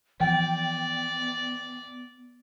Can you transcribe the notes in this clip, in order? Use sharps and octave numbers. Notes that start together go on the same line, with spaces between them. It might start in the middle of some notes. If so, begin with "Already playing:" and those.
E3 F3 B3 D5 G5